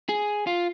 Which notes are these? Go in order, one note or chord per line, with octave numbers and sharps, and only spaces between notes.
G#4
F4